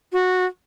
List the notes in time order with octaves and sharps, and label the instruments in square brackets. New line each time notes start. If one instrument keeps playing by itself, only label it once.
[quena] F#4